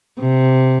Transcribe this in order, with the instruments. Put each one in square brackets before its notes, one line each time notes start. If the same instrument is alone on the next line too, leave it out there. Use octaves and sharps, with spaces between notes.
[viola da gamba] C3